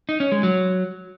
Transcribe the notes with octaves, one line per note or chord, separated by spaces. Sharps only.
D#4
C#4
G#3
F#3